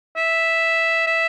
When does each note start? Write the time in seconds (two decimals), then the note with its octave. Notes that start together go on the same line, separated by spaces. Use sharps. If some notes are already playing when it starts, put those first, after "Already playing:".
0.16 E5
1.07 E5